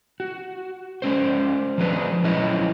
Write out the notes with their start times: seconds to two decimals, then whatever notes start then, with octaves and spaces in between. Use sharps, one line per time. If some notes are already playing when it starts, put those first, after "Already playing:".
0.20 F#4
1.02 G#3 C#4 C5
1.78 F3 G#3 D4 B4
2.24 F3 F#3 C#4 E4 B4 D#5